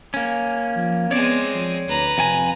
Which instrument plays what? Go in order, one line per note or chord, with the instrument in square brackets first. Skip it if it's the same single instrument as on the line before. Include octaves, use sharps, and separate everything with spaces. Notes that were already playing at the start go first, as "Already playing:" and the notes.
[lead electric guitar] A#3 C#4
[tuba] F3
[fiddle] G#3 C4 [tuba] B3 [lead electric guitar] C#5 D5
[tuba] F3
[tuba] D2 [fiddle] B4 A#5
[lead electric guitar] F2 G#5 [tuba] C3